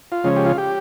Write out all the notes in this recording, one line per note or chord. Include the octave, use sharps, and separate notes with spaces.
F4
C#3 F3 G#3 C#4
G4
F4
G4